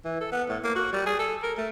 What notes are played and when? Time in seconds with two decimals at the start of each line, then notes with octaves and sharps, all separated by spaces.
0.05 E3
0.21 A4
0.32 B3
0.49 A2
0.64 A#3
0.75 F#4
0.93 G3
1.06 G#4
1.19 A4
1.43 A#4
1.57 A3